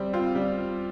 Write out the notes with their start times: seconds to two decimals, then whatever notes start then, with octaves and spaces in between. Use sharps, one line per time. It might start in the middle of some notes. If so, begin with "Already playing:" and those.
Already playing: G3 C4
0.13 C4 F4
0.35 G3